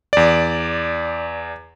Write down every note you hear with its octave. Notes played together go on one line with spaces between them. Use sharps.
E2 D5